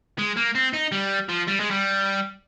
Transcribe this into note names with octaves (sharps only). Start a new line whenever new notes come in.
G#3
A#3
C4
D#4
G3
F3
G3
G#3
G3